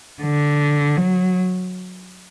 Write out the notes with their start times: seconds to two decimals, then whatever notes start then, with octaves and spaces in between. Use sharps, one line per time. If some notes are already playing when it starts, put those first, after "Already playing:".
0.23 D3
0.97 F#3